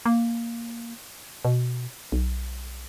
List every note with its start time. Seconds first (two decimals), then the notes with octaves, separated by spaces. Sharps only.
0.06 A#3
1.45 B2
2.12 B1